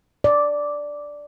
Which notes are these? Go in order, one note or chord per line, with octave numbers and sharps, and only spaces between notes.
D5